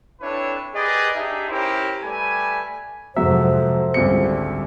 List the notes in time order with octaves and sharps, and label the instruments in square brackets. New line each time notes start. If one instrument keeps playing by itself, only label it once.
[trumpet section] C4 D4 E4 A4 B4 C#5
G4 G#4 A#4 B4 D5 D#5
D4 D#4 G4 G#4 E5
C#4 E4 G4 A#4 C5
G3 A3 B4 D5 G#5
[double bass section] F2 C3 F3 [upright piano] G#2 F#3 [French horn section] A4 C5 [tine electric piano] E5
[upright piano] G#1 C#2 C#7 [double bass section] D3 G3